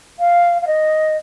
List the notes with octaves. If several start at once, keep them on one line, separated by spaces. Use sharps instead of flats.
F5
F5
D#5